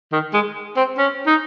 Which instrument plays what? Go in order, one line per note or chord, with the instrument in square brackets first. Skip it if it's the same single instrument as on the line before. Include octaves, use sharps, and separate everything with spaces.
[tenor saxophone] D#3
G#3
C4
C#4
D#4